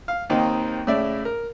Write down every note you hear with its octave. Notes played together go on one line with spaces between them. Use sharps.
F5
D#2 D#3 A#3 C4 D#4
A2 C#3 D5 E5
A#4